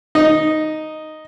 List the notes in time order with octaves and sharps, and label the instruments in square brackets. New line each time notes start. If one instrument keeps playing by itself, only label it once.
[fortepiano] D#4